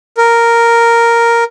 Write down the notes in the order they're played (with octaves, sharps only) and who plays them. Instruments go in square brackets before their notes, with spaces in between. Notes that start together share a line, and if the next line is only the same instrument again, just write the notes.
[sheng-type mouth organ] A#4